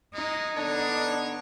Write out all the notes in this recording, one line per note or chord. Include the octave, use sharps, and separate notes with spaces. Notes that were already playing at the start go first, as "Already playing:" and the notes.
G#3 D#4
D3 B3 D4 C#5